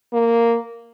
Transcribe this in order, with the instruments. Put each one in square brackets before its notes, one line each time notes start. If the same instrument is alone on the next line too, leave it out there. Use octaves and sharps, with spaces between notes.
[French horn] A#3